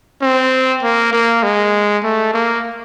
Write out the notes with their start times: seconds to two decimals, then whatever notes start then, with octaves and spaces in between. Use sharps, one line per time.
0.22 C4
0.83 A#3
1.13 A#3
1.43 G#3
2.03 A3
2.34 A#3